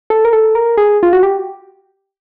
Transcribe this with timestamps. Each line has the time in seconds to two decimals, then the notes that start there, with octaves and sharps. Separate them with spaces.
0.10 A4
0.25 A#4
0.33 A4
0.55 A#4
0.77 G#4
1.03 F4
1.13 F#4
1.23 G4